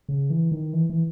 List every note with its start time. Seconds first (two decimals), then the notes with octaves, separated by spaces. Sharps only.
0.09 C#3
0.30 E3
0.52 D#3
0.73 E3
0.90 E3